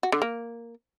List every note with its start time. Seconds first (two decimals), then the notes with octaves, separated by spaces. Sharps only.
0.03 F#4
0.12 D3
0.22 A#3